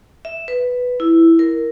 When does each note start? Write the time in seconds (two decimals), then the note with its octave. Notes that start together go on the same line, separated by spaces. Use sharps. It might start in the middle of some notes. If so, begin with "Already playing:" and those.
0.25 E5
0.48 B4
1.00 E4
1.39 A#4